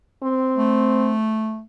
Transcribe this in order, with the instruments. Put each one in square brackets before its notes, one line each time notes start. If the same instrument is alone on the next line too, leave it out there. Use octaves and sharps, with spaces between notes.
[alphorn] C4
[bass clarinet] A3